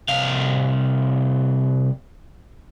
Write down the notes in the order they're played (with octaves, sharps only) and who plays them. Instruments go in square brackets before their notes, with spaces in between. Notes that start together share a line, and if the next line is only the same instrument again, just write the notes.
[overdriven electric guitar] C2 F5